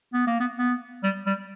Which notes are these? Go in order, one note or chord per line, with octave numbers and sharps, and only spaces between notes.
B3
A#3
B3
B3
G3
G3